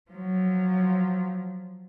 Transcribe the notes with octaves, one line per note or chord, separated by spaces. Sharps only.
F3 F#3